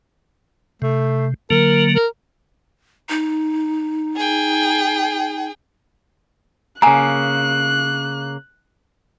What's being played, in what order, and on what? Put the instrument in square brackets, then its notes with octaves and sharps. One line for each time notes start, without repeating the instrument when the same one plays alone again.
[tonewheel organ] C3 [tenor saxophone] A3
[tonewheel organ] D3 F#3 A#3 [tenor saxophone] A#4
[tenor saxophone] A#4
[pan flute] D#4
[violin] G#4 G5
[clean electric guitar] C#3 A#3 [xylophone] G#5 A#5 [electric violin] F#6